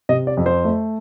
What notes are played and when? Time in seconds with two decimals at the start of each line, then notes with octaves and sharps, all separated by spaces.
0.09 C3 D#5
0.27 D5
0.37 F2
0.46 C5
0.64 A3